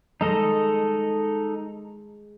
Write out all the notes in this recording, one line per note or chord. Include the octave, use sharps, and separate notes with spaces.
G#3 D#4 A4 D#5